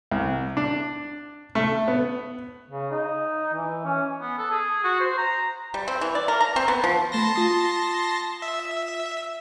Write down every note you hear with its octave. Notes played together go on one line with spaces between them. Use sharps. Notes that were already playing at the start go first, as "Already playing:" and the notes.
C2
D4
A3
B3
C#3
D#4
E3
C#4
B3
A4
G#4
F#4
C5
A#5
G3
C4
E3
D5
A#4
A#5
C4
B3
F3
A3 A5 B5 C6 A#6
F4 D#6
E5